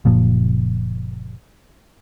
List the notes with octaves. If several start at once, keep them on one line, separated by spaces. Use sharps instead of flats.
F#1 A#2 F3